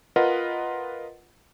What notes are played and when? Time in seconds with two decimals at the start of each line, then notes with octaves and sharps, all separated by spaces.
0.16 F4 A#4 B4 D#5 F#5